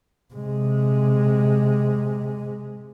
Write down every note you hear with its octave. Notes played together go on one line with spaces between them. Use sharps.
C3 G#3